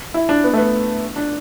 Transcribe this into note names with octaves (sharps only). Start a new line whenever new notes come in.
E4
D4
B3
A3
B3
D4